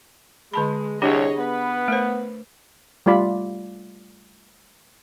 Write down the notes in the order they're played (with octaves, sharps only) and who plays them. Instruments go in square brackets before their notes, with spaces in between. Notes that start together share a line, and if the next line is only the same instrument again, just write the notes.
[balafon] D3 A5 B5 [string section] G#3
[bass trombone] C2 [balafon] D4 G4 F#5 [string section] G#4 C#5 D#5
[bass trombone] B3 [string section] B4
[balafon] A3 A#4 C5
[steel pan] G3 A3 F4 D5 B5